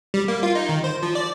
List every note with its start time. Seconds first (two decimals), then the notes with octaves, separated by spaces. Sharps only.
0.14 G3
0.28 A#3
0.43 F4
0.55 D#4
0.69 D#3
0.84 C5
1.03 F3
1.15 D5